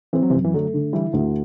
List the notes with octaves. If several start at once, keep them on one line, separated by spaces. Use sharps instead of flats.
E3 C4
F#3
C3 E3
F#2
E3
D3 F#3 A3
D3
E3 G3 E4
D2